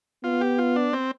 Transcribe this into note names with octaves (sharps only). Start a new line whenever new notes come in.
B3 F4
G4
F4
D4
C4